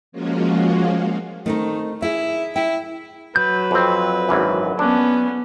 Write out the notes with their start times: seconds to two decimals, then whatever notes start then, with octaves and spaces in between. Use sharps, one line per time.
0.12 F3 G#3 A#3 C#4 F4 F#4
1.46 D#3 A3 C4 D#4
2.02 E4 G#4 E5
2.56 E4 G5
3.36 F#3 B4 G6
3.71 F2 C4
4.29 G#1 F#2 E3
4.79 B3 C#4 D4